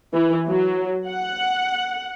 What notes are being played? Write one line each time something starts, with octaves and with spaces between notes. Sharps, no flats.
E3
F#3
F#5